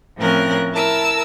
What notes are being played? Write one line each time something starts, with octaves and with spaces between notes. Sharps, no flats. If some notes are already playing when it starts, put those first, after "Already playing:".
A2 F3 C4 C#4 A#4 F#6
E4 A#4 A5 E6